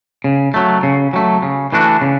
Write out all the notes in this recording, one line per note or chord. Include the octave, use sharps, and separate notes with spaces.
C#3
F#3 A3
C#3
F#3 A3
C#3
E3 A3 D4 F#4
C#3